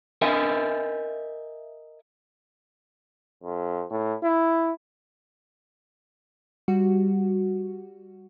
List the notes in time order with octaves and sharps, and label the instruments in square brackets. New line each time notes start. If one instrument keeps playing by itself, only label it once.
[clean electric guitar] A#4 D#5 E5 G#5
[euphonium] F2
A2
E4
[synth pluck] G3 F#4